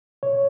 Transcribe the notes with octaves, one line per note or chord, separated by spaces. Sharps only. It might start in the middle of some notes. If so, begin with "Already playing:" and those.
B2 C#5